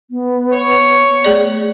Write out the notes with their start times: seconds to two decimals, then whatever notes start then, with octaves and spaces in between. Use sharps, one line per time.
0.10 B3
0.53 C#5
1.24 A3 G#4 D5